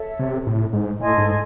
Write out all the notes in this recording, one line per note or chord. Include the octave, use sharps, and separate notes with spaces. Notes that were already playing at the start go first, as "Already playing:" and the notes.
Already playing: A4 C#5 E5
C3
A2
G#2
A2 A4 D#5 G#5 C6
G#2